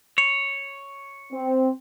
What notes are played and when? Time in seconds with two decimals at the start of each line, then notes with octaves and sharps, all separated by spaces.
0.18 C#5
1.32 C4